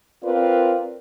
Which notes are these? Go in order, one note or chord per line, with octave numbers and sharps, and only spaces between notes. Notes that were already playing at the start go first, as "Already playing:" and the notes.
C4 F4 A#4 B4 D5